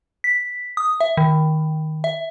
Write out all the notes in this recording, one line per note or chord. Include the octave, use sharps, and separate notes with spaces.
B6
D#6
E5
D#3
E5